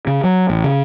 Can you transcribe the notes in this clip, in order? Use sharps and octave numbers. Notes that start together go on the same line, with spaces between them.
C#3
F#3
A1
C#3